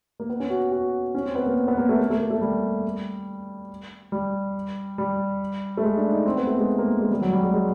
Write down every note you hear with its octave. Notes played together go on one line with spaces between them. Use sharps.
A#3
B3
C#4
F#4
F#4
C#4
C4
B3
A#3
B3
A#3
A3
A#3
A3
A#3
A3
G3
G3
G3
A3
G#3
D4
D#4
C4
B3
A3
G#3
A#3
G#3
G3
F#3
G3
G#3
G#3